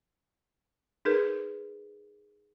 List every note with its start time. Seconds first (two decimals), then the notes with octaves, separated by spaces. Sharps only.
1.05 D#4 G#4 A#4 B4